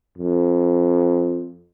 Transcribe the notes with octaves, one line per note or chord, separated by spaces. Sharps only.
F2